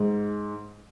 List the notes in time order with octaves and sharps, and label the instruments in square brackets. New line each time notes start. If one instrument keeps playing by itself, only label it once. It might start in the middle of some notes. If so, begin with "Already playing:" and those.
Already playing: [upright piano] G#2